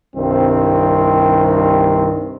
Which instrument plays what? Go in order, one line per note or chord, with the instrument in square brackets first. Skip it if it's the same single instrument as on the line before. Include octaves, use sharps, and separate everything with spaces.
[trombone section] C2 G2 D#3 C4